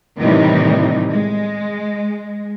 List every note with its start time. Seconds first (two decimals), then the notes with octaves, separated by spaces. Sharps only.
0.19 A2 C3 D#3 E3 G3 D#4
1.12 G#3